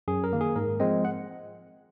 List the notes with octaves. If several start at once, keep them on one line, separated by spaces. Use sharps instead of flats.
F#2 G#4
A#4
D#3 A#3
G#4
G#2 A#4
F3 G#3 C4 D#5
F#5